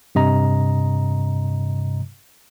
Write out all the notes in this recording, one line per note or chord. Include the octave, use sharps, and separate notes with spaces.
G2 C3 D#5 A#5